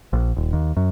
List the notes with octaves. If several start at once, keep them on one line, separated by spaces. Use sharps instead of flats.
A#1
D#1
D#2
F#2